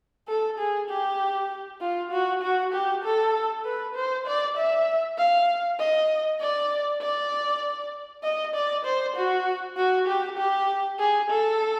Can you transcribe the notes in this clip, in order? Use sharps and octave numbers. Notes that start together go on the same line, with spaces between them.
A4
G#4
G4
F4
F#4
F#4
G4
A4
B4
C5
D5
E5
F5
D#5
D5
D5
D#5
D5
C5
F#4
F#4
G4
G4
G#4
A4